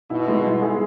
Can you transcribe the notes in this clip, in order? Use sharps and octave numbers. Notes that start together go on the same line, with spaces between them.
B2 E4
G#3
E4
G#4